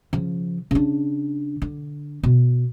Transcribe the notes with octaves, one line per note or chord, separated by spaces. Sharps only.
C#3 F3
C#3 D4
D3
B2